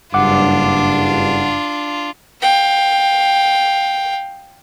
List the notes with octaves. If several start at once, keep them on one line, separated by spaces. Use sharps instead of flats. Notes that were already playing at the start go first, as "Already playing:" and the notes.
F#1 G2 D4 F4 F#5 D6
F5 G5